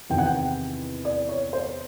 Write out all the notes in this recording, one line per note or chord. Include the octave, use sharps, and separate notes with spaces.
E2 C3 D#3 G5
F#5
G5
D5
C#5
C5